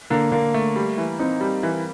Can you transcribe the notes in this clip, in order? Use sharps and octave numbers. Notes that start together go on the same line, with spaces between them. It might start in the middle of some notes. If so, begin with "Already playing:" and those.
D3 A#3
D3 A#3
A3
G3
E3
C4 D#4
G3
E3